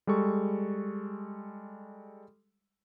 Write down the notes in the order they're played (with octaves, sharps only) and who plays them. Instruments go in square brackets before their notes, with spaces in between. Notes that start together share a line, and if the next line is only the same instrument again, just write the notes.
[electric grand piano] G3 G#3 A4 C#6